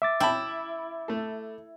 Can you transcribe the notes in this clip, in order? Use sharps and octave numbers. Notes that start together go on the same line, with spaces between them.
E5 D6 A6
E4 G5 A5 B5
A3 A4